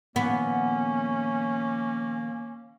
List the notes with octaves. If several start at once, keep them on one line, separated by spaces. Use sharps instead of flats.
A#2 D#3 F3 A#3 B3 C#4